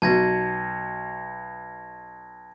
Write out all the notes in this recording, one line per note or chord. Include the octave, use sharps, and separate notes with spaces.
B1 B2 A5 G#6 A#6